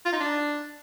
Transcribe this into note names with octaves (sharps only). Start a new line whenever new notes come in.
F4
D#4
D4